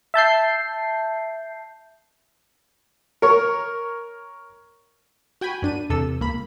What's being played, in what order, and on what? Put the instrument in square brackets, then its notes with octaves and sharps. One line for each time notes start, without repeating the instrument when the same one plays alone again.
[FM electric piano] E5 A5 G6 C7
[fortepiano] A#4 C#5
[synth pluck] F#4 G5 G#5 B5
F#2 D4 D#7
E2 C3 A4 E6
C#2 A#3 B5